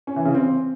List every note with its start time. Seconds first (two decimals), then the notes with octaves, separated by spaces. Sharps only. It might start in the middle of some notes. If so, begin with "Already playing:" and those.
0.07 C#4
0.16 E3
0.25 C#3
0.34 C4